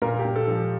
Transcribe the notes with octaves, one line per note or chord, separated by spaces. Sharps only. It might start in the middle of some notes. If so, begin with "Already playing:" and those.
A#2 A#4
G4
A#2
A4
F3